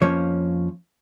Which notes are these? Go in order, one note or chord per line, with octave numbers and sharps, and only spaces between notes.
F2 F3 A#3 C#4 C#5